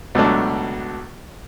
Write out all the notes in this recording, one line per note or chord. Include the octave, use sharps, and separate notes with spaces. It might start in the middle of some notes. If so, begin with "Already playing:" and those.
C#2 B2 F#3 A3 D4